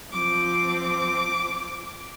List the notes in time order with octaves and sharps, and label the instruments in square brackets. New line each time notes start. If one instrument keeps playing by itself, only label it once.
[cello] F3 C4 [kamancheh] D6